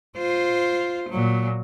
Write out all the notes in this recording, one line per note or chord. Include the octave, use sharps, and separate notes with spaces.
F4 C5
A#2 F#3